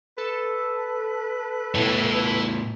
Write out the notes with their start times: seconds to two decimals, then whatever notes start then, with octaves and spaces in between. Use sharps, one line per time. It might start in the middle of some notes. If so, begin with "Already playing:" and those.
0.18 A4 B4
1.75 A2 B3 E4 C#5